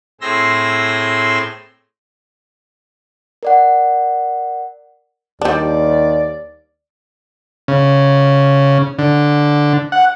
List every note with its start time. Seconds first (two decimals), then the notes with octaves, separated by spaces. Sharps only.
0.21 A2 C4 G#4 C6 E6 A#6
3.43 A#4 D5 F#5
5.41 D#2 G3 D4 D5
7.68 C#3
8.99 D3
9.92 F#5